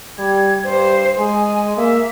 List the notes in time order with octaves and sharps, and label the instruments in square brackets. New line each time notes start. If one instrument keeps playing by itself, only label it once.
[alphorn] G3 [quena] G#6
[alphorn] G2 [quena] C5
[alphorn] G#3 [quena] G#5
[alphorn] A#3 [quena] E5